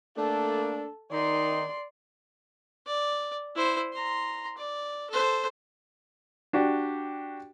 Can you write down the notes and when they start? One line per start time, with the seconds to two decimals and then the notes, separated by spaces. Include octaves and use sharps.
0.17 A3 A#3 D4 A4
1.11 D#3 D#4 D5 C6
2.87 D5
3.55 E4 C5
3.93 A#5 C6
4.57 D5
5.10 A4 C5
6.53 D4 F#4 G4